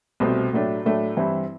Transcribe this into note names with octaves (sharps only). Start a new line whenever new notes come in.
C2 B2 A3 C4
A2 F#3 A3 D4
A2 F#3 A3 D4
G2 E3 G3 C4 E4